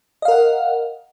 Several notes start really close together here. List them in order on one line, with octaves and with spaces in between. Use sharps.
D#5 F5 A#4 F#5